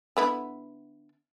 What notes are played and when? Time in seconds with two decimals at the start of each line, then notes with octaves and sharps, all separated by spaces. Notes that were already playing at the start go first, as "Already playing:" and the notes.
0.17 D3 B3 E4